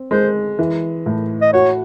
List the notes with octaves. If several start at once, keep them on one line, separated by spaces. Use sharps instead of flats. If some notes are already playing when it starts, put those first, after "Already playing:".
Already playing: C4
G#3 C5
E3
A2
D#5
F#4 C#5